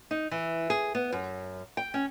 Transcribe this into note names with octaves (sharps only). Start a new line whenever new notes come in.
D#4
E3
G#4
B3
F#2
G5
C#4